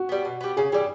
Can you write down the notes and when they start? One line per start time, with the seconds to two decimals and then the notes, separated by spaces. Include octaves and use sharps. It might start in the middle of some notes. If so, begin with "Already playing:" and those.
Already playing: F#4
0.09 G3 B3
0.25 B2
0.41 G3 B3
0.57 C#3 G#4
0.72 E3 G3 G#4